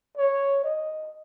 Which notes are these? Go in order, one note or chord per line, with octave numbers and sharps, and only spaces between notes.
C#5
D#5